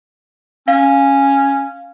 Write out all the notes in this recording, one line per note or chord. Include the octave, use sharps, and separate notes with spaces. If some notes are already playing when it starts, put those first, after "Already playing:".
C#4 F5